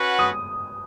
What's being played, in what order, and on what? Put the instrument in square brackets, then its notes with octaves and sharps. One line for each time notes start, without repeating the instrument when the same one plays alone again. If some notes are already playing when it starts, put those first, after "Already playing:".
Already playing: [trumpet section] C#4 F#4 B4 F#5
[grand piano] D#6